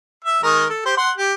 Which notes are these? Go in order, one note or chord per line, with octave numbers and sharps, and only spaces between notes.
E5
D#3 G#3 A#4
A4
G4 C5
F#5 C6
G4